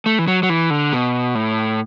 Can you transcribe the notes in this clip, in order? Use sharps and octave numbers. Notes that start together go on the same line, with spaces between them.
A3
E3
F#3
F#3
E3
D3
B2
A2